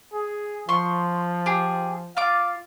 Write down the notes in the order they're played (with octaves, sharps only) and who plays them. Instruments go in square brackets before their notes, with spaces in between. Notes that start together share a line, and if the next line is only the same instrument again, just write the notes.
[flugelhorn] G#4
[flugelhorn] F3 [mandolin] C6 C#6
[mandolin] G4 G#4
[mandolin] F4 D6 [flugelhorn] F5